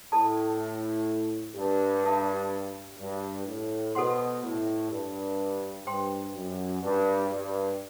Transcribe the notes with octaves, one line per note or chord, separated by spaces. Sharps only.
A2 A4 D5 A5
G2
D4 A4 E5 A5
G2
A2
B2 F#4 A4 C5 F#5 C6
A2
G2
G2 C5 G5 C6
F#2
G2
G2